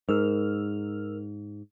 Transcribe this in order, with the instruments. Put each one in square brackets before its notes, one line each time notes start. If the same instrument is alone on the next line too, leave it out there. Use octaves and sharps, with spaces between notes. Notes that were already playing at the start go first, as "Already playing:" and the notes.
[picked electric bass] G#2 [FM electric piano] A#4 E6 F6